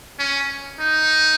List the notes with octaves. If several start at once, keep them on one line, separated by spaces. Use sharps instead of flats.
C#4
D#4